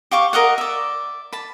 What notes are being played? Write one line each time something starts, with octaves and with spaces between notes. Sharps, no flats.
G4 F5 C#6 D6
A#4 D#5 F5 F#5
D5 E5
A5 B5